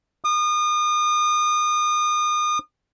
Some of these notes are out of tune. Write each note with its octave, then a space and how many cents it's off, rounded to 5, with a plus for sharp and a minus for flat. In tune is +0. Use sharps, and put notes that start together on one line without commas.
D#6 -35